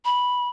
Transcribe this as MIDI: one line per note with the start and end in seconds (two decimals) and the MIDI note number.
0.05 0.49 83